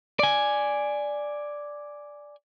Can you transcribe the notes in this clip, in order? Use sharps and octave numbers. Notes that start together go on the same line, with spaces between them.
D5 G#5